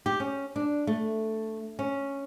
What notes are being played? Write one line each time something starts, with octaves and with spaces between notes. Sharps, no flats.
G4
C#4
D4
A3
C#4